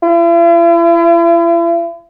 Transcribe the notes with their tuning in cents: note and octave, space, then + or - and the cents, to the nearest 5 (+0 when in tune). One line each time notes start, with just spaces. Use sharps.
E4 +45